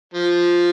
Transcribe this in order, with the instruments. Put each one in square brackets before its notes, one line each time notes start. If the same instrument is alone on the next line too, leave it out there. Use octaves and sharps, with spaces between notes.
[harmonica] F3